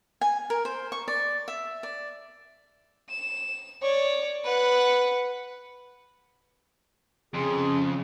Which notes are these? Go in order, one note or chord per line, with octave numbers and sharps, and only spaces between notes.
G#5
A#4
C5
C#6
D5
E5
D5
E7
C#5 D5
B4 F#5
F2 C#3 G#4 C6